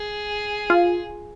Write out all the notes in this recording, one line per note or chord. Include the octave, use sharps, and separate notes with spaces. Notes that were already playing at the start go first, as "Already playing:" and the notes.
Already playing: G#4
F4